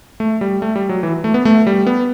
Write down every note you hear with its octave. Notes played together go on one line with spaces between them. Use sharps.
A3
G3
A3
G3
F#3
E3
A3
B3
A3
G3
B3